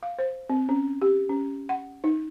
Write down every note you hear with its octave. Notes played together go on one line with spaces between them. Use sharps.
F5
C5
C4
C#4
G4
C#4
F#5
D#4